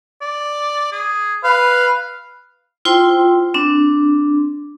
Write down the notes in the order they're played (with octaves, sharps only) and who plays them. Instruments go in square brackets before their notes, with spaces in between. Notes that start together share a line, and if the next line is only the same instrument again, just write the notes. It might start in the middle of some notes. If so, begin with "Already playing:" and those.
[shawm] D5
G#4
[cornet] B4 [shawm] F5
[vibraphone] E4 F4 C5 G5 C6
C4 D4